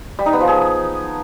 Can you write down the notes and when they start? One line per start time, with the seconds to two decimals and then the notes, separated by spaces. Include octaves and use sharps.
0.19 G3
0.26 D#4
0.33 B3
0.40 F3
0.48 G#4